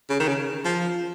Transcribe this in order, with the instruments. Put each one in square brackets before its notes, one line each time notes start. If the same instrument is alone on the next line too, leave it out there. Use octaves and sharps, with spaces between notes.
[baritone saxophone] C#3
D#3
C#3
F3